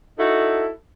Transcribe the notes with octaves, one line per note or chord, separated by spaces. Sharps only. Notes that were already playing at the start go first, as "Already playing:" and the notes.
D#4 E4 F#4 A4